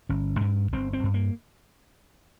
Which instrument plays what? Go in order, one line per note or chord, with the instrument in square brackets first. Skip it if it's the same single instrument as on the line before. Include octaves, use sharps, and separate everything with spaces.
[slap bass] G1 C#4
G2
G1 C4
C4
G2
A#3